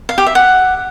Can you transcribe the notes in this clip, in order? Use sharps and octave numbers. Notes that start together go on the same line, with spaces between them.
F5
G4
E5
F#5